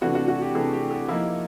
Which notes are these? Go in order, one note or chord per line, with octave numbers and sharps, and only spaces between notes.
C3 E3 A3 D4 F#4
F#4
F#4
G4
C3 E3 A3 D4 G#4
G4
G#4
F3 A#3 D#4 E4